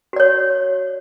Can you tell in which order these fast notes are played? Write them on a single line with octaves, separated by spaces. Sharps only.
F#4 D5 C#5